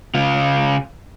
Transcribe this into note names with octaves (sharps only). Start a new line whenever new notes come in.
C#3 F4